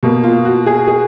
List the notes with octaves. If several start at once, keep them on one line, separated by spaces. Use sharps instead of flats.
B2 A#3
F4
F#4
G#4
G#4